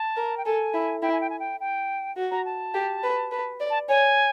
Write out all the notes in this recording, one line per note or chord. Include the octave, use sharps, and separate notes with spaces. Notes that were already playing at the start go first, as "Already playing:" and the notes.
Already playing: A5
A#4
G5
A4 G#5
E4
E4 G5
G#5
G5
G#5
G5
G5
F#4
A#5
A5
G4
B4
B4
D5
A5
C#5 G#5